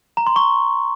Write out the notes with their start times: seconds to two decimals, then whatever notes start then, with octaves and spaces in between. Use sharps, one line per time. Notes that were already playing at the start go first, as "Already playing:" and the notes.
0.17 A#5
0.27 C6
0.36 C#6